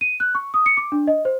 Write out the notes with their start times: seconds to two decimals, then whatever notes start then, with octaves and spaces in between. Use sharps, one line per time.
0.01 D#7
0.20 F#6
0.35 C#6
0.54 D#6
0.66 C#7
0.77 D6
0.92 D4
1.07 D#5
1.25 C5